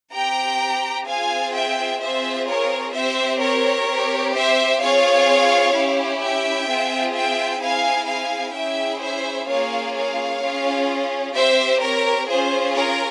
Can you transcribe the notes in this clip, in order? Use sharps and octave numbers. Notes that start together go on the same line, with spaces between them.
C4 G4 G5 A#5
C4 F4 G#4 F5 G#5
E5 G5
C4 F4 G#4 C5 E5
A#4 C#5
C4 G4 C5 E5
A#4 C#5
C4 G4
C5 E5
C4 F4 G#4 C#5 F5
C#4 E4 G4
E5 G5
C4 F4 G#4
E5 G5
C4 E4 G#4 F5 G#5
F5 G#5
C#4 E4 G#4 E5 G5
C5 E5
A#3 C#4 F4 G#4 C#5 F5
C#5 F5
C#4 F4 G#4
C4 G4 C5 E5
A#4 C#5
C#4 F4 G#4 C5
A#4 C#5